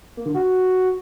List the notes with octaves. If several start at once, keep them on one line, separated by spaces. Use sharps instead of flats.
A#3
D3
F#4